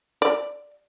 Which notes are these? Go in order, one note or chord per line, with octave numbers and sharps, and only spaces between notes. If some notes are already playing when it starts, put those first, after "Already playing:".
D5